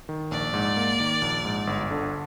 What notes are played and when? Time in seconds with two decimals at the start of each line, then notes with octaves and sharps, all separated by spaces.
0.09 D#3
0.31 A#1 D5
0.54 G#2
0.77 A#3
1.00 D#3
1.22 A#1
1.45 G#2
1.67 G1
1.91 D3